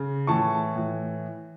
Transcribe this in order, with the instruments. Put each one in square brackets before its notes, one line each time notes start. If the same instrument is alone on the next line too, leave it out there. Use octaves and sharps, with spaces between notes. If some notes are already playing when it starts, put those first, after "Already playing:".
Already playing: [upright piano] C#3
A2 E3 A5 C#6
A2 E3